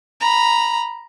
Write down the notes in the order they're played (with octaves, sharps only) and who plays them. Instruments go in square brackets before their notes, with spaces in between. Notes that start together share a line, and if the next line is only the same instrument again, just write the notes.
[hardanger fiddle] A#5 B5